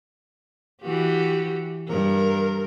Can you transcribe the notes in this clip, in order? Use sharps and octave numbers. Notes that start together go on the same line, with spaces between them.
E3 F#4 G4
G2 A#4